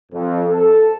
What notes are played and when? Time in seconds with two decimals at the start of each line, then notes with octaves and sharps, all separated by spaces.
0.12 F2
0.50 A4